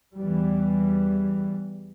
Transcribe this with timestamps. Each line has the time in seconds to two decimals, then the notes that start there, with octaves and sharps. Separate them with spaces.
0.16 E2 E3 G3